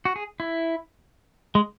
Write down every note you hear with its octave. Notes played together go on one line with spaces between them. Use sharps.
F#4
G#4
E4
G#3